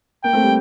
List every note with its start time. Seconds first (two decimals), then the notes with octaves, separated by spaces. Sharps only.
0.24 A#3 G5
0.33 A3 C4
0.43 G3